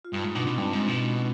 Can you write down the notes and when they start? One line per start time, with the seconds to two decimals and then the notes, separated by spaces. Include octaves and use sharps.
0.05 F4
0.13 G2 D#4
0.24 G#2 F4
0.35 B2 D4
0.46 B2 C4
0.58 G2 G#3
0.73 G#2
0.88 B2